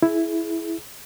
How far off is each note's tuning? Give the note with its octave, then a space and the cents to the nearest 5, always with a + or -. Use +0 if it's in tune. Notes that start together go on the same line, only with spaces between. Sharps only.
E4 +0 G#4 +25